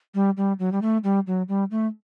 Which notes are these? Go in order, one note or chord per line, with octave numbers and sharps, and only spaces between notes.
G3
G3
F#3
G3
A3
G3
F#3
G3
A3